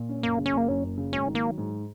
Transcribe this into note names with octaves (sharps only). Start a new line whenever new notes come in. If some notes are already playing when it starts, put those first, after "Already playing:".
Already playing: A#2
C#4
F#1 A#3
C#3
C#4
F#1 A#3
F#2 C#4
F#1
C#3
G#1 C#4
D#3
A#3
F#3
G#2